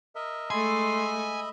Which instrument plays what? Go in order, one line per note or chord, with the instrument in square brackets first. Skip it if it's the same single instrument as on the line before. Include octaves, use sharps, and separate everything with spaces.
[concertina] A#4 D#5 E5
[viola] G#3 A3 [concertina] D#5 E5 B5 [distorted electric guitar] G#5 [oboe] C6